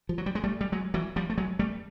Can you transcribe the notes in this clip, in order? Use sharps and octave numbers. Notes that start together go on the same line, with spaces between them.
F3
F#3
G3
G#3
G3 A3
G3
F#3 G#3
E3 F#3
F3 G3
A3
F#3 G#3
G3 A3